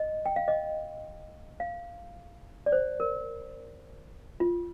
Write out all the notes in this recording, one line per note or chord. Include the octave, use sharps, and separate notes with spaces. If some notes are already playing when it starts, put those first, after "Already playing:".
Already playing: D#5
G5
F5
D#5
F5
D5
C5
A#4
F4